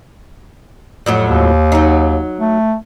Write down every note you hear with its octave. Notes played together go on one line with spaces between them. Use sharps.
F2 A2 F#3
D#2
F#3 D#4
A3